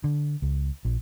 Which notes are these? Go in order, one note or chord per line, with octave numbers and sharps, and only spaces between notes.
D3
C#2
A#1